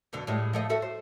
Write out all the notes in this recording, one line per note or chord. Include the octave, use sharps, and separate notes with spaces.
F2 B2 D3
A2 G3 G#3
F3 A3 D#5
F#4 A4 E5
C5